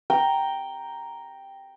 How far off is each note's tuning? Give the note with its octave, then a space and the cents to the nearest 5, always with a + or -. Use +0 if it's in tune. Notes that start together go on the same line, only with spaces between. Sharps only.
G5 +0 A#5 +0